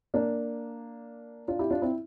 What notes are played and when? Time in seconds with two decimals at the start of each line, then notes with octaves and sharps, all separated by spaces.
0.14 A#3 D4
1.48 D4 F4
1.59 E4 G4
1.70 D4 F4
1.82 C4 E4